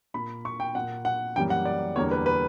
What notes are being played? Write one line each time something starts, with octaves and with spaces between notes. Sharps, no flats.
A#2 A#3 B5
C#6
G5
A#2 A#3 F#5
F#5
F#2 E3 G3 A#3 G5
F#5
D5
E2 D3 G3 A#3 C#5
B4
B4